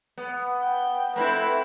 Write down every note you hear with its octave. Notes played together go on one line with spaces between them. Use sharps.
B3
G5
A3 C4 E4 B4